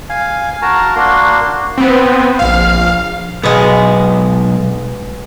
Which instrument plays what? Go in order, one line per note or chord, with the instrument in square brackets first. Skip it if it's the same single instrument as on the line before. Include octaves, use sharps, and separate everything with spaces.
[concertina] F5 G#5
F#4 A#4 A5 A#5
A#3 D4 F#4 C6
[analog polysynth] B3 C4
A#1 F5
[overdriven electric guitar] B1 [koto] G#3 B3